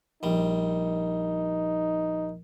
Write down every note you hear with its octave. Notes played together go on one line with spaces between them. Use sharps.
A#1 G3 D#4